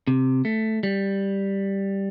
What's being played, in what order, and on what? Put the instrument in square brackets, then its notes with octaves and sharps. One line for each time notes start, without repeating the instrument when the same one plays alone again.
[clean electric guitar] C3
A3
G3